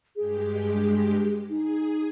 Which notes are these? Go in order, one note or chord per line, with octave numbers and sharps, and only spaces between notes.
G2 G#3 G4 G#4
D#4 G#4